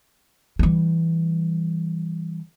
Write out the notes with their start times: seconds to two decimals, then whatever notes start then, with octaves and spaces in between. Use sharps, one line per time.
0.59 E3 G3